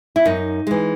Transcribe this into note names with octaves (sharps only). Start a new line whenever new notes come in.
E4
F#2 D#4
E3 G#3